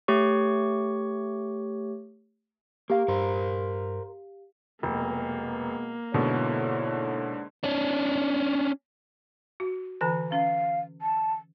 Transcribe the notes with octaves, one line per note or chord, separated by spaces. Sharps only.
A3 G4 C#5 C#6
A#3 G4 F5
G2 A#4 C5
F1 B2 G#3 A#3 B3
G#2 B2 D3 E4 A4 C#5
C#4 D4
F#4
D3 E3 G#5
C#4 F5
A5